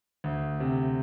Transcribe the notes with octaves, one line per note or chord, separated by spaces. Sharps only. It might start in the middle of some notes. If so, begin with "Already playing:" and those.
D2
C3